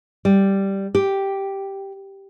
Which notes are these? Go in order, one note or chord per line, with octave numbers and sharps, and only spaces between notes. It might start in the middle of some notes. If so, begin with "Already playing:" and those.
G3
G4